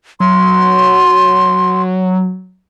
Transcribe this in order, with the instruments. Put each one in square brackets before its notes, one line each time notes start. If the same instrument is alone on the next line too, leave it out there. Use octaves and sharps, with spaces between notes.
[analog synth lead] F#3 [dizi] C6